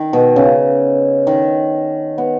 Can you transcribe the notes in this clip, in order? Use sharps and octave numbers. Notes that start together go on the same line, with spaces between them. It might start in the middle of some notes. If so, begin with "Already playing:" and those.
Already playing: D#3
B2
C#3
D#3
B3